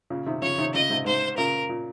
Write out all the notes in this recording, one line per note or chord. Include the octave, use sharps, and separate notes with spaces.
A#2 C#3
C3 D#3
C#3 F3 C#5
C3 D#3
A#2 C#3 D#5
G#2 C3
G#2 C3 C5
A#2 C#3 A#4
A#2